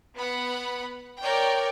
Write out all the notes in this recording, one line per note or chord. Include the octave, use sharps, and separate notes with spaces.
B3 F#5 B5
A#4 C#5 D5 G5